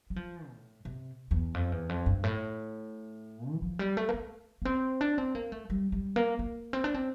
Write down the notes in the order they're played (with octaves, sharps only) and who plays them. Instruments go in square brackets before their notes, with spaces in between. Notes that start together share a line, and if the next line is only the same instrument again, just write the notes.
[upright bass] G3
F3
A2
C3
E2
F2
E2
F2
G2
A2
E3
F3
G3
A3
A#3
A3
A#3
C4
D4
C4
A#3
A3
G3
G3
A#3
A#3
C4
D4
C4